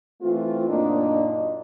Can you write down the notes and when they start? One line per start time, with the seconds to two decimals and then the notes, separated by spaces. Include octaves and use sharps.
0.22 E3 A3 C4 F4
0.68 F#2 A#2 A#3 D4 D#4 D#5